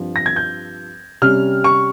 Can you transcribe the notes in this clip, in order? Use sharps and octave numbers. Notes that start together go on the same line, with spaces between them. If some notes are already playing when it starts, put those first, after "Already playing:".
Already playing: G2 F3 C4
A#6
G#6
G6
C3 G3 C#4 F6
C#6